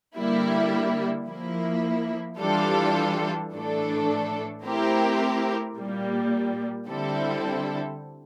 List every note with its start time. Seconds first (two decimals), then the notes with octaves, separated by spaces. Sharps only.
0.16 D3 G3 A#3 E4
1.27 F3 A#3 E4
2.39 E3 G3 D4 F4 A4
3.52 A2 E3 A3 D4 A4
4.64 A3 C4 E4 G4 A#4
5.75 A#2 G3 A#3
6.87 D3 G3 C4 E4 A4